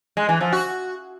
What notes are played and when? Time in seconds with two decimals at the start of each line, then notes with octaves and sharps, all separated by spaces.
0.17 G#3
0.29 E3
0.41 F3
0.53 F#4